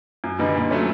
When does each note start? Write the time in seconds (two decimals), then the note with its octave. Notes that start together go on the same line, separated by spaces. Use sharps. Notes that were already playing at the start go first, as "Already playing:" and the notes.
0.24 F#2
0.39 D3 G3 B3 D#4
0.55 A#2
0.71 F#3 A3 C#4